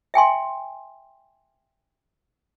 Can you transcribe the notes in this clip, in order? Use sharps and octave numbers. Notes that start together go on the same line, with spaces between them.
E5 G5 G#5 C6